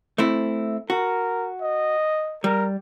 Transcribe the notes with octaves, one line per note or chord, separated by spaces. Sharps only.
A3 C4 E4
F#4 A#4
D#5
G3 A#4